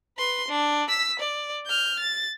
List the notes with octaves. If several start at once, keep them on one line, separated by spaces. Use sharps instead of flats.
B4 C6
D4
E6 B6
D5
F6 G6
A6